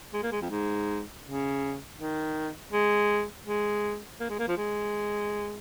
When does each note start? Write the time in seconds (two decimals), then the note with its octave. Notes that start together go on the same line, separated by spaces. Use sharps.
0.14 G#3
0.23 A#3
0.32 G#3
0.41 F2
0.50 G#2
1.25 C#3
1.98 D#3
2.72 G#3
3.46 G#3
4.20 A#3
4.29 G#3
4.39 A#3
4.48 F3
4.57 G#3